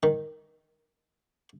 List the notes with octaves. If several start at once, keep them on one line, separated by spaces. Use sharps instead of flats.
D#3